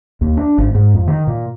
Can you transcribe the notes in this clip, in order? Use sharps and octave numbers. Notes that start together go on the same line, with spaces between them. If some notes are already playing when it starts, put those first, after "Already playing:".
D#2
D4
G#1
G#2
F2
D#3
A#2